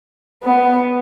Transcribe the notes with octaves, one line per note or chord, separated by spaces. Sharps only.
B3